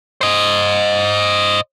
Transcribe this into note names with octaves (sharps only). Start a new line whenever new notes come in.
C5 D#5